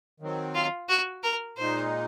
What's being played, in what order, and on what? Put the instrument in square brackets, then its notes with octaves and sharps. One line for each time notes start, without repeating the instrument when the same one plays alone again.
[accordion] D#3 F#3 C4
[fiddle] F4
F#4
A#4
[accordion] A#2 G#3 D#4 [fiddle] C5